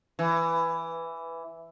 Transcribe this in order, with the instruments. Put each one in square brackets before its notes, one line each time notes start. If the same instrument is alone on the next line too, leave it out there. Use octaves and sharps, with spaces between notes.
[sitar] E3